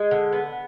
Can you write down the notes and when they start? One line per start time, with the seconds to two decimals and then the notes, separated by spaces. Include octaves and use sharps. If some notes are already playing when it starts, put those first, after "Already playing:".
Already playing: G#3
0.11 D3
0.33 B3